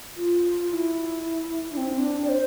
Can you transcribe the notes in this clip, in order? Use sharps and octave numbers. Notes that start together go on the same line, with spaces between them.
F4
F4
E4
D4
C4
D4
D5
C5